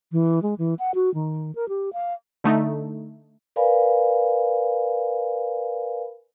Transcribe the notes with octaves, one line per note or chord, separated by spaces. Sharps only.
E3
G#3
E3
F#5
F#4
D#3
A#4
G4
F5
D3 A3 D#4
A#4 B4 D5 F5 G#5 B5